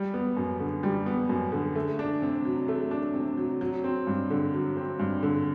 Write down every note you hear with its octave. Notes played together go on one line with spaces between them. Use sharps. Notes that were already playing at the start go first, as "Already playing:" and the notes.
Already playing: G3
B3
F#2
D3
G3
B3
F#2
D3
A3
D4
C3
F#3
A3
D4
C3
F#3
F#3
C4
G2
D3
F#3
C4
G2
D3